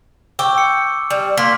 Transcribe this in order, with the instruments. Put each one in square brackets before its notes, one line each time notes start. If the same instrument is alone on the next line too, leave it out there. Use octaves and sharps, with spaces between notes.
[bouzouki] G5 [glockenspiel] C#6 D6 E6
[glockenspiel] C#7
[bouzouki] G3
[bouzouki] A#3 [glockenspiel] C6 D6 B6